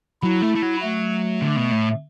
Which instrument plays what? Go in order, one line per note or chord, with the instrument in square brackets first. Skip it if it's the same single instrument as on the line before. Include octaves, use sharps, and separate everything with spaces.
[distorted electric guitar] F#3 [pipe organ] E4
[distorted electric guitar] A3
A3
F#3
[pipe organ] A3
[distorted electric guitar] D3
B2
A2